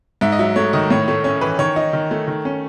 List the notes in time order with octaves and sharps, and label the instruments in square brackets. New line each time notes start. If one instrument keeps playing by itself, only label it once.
[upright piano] G#2 [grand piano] E5
[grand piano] D#5
[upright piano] F#3 [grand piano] E5
[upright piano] A3 [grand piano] C#5
[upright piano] D#3 [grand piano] D#5
[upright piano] A2 [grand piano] C#5
[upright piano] A3 [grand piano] C#5
[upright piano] C#4 [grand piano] C#5
[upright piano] E3 [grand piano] B4
[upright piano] D#3 [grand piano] C#5
[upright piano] D#4
D#3
A3
D#3
C#4